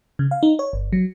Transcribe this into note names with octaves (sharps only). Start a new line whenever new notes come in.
C#3
F5
D#4
C#5
G1
F#3